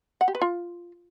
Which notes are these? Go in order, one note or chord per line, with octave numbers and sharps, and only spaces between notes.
F#5
G4
B4
F4